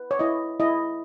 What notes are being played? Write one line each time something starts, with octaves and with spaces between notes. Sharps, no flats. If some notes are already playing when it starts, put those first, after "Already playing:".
Already playing: B4
C#5
E4 D#5
E4 D#5